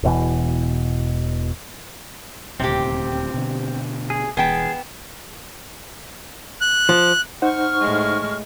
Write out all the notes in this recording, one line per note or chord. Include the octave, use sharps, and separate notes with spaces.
E1 B2 E3
D#1 D2 C3 C4 G4
B2 D3
G#4
E1 E2 B3 G#4 G5 A5
F#6
F3
D#4 C5 F#5 C#6 F6
A2 G#3